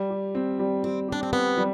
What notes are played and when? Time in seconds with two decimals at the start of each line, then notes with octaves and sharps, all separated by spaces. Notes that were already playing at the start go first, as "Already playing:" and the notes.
Already playing: G3
0.10 G4
0.35 C4
0.59 G3
0.84 G3 C4
1.08 D4 G4
1.23 C4
1.33 B3 C4
1.58 G3